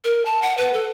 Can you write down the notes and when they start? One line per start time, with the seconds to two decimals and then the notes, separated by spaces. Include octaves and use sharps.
0.04 A#4
0.25 A5
0.42 F#5
0.58 B4
0.73 A4